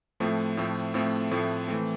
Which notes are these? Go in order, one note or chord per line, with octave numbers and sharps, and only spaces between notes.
A2 F3 A3 C4
A2 F3 A3 C4
A2 F3 A3 C4
A2 F3 A3 C4
E3 A3 C4